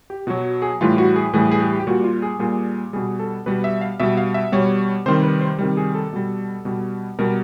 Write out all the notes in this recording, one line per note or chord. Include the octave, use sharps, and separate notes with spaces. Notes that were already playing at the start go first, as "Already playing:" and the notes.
G4
B2 F#3 F#4
G#4
A2 E3 G3 F4
F#4
G#4
A2 E3 G3 G#4
G#4
G4
G4
A#2 G3 F#4
F4
G#4
A#2 G3 G#4
B2 G3 G#4
A4
B2 G3 B4
E5
F5
B2 G3 E5
F5
E5
B2 G3 C#5
C3 D#3 G3 C5
B4
C5
C3 D#3 G3
G#4
A4
B2 G3
B2 G3
B2 G3 A#4